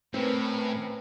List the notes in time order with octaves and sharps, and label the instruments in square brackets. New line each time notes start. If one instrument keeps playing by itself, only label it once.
[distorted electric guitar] A2 [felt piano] C4 [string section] C#4 A#4 B4